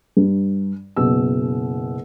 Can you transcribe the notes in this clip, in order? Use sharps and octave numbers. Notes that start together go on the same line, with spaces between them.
G2
F#1 B2 E6